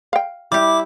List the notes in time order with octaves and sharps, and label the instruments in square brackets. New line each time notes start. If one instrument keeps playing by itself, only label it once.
[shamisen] F5 G5
[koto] G3 G4 [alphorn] E4 [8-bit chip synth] D6